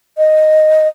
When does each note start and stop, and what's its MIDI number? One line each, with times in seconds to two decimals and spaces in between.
0.18 0.88 75